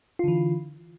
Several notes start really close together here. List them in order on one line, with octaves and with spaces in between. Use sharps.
F4 D3 E3